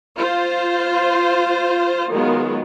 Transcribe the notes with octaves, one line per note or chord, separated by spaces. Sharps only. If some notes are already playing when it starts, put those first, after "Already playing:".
F4 C5
D#3 F#3 G#3 B3 F4